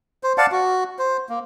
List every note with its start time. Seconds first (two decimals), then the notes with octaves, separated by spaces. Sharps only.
0.23 C5
0.38 D5 F5 F#5 A5
0.52 F#4
0.99 C5
1.29 A#3